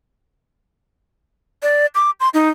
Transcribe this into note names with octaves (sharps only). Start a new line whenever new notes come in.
D5
D6
C6
D#4